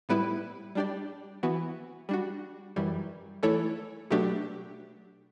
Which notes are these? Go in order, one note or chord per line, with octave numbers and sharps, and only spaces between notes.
A2 G3 B3 E4 B4
G3 D4 G4 D5
E3 B3 F#4
G3 D4 F#4
F#2 E3 G3
E3 A3 E4 A4 C#5
B2 F#3 A3 D4 G4